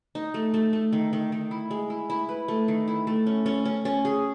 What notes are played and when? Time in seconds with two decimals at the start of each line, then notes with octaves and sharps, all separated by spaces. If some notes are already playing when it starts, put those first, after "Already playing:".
0.15 D#4
0.34 A3
0.54 A3
0.73 A3
0.93 D#3
1.13 D#3
1.32 D#3
1.51 E4
1.71 G#3
1.90 E4
2.10 E4
2.29 B4
2.48 A3
2.68 D#3
2.88 E4
3.07 A3
3.27 C#4
3.46 C#4
3.65 C#4
3.85 C#4
4.05 G#4